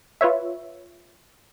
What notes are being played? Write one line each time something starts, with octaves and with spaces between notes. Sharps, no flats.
F4 B4 C#5 E5